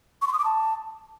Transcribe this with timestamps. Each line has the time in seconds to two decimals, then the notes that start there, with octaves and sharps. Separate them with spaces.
0.22 C#6
0.27 C6
0.33 D#6
0.39 D6
0.45 A5